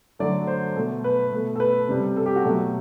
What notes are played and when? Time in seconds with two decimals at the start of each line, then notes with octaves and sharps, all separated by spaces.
0.19 D3 F#3 A3 D5
0.47 C5
0.76 B2 A3
1.04 B4
1.32 B2 A3
1.56 A4
1.60 B4
1.89 C3 G3
2.17 A4
2.26 G4
2.36 F#4
2.44 B2 F#3 A3